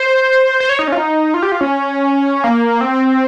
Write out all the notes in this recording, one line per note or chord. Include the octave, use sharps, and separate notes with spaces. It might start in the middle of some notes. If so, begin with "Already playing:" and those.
Already playing: C5
C5
C#5
D#4
C#4
F4
D#4
F4
G4
F4
C#4
A#3
C4